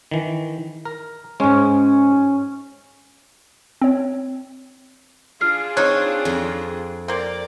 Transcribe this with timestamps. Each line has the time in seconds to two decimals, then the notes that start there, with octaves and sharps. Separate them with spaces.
0.11 D#3 E3
0.85 A#4
1.40 G#2 G#3 C#4
3.82 C4 C#5
5.41 D4 F4 G#4 F6 C7
5.77 C4 D#4 C#5 F#6
6.25 F2
7.08 A#3 C4 A#4 D5